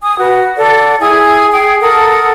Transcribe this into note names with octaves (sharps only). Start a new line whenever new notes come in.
G#5 D#6
F#4 B4
A4 D5 F#5
E4 G#4 G#5 D#6
G#4 G5 D#6
A4 A#4 F#5 D#6